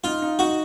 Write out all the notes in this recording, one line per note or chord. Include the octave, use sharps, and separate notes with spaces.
D#4 F4
D#4
D#4 F#4